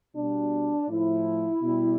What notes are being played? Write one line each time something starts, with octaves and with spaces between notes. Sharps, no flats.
B2 G3 D4
A2 F3 E4
B2 G3